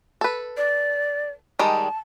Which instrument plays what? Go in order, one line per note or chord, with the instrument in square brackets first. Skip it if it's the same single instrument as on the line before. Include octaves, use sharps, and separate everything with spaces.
[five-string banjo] A4 B4
[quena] D5
[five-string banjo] D#3 G3 G#3 [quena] A5